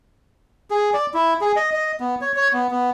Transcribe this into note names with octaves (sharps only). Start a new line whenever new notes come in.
G#4
D5
E4
G#4
D#5
D#5
B3
C#5
C#5
B3
B3